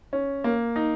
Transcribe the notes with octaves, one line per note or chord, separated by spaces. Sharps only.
C#4
A#3
D#4